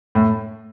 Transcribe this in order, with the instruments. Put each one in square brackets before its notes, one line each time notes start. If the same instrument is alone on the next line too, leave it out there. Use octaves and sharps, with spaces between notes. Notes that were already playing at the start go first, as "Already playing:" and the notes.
[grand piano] A2